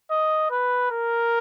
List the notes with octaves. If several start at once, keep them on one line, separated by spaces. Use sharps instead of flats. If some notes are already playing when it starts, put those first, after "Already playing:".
D#5
B4
A#4